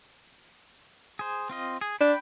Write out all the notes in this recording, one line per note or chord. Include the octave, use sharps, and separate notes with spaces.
G#4 C5
C4 F4 D#5
G#4
D4 G5 B5